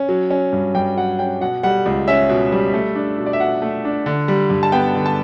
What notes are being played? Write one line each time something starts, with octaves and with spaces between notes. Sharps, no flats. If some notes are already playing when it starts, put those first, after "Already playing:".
Already playing: C#4
F#3
C#4
G2
G2 G5
F#3 F#5
C#4 G5
B2 F#5
G3 F#5
C#2
C#4 E5
B2
G3
A3
D4
B2
D5
E5
B2 F#5
A3
D4
D3
G3
G2
A5
B3 G5
D3
A5